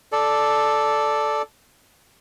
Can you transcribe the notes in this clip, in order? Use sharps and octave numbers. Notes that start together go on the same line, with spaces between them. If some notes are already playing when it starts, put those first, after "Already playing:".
A4 D5